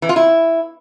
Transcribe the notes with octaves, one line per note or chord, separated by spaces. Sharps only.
E3
F4
E4